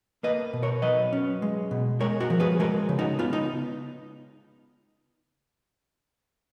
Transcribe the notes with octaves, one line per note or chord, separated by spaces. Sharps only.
A#3 B4 D#5
B2
A#4 C#5
F#3 B4 D#5
C#4
G#3
B2
G#3 A#4 C#5
F#4 A#4
F3
G#4 B4
G#3 F#4 A#4
C#3
D#4 F#4
B3 F4
D#4